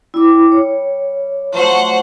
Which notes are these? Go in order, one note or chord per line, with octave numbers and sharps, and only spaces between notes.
G3 E4 D6
C#5
F3 F#3 A3 C5 F#5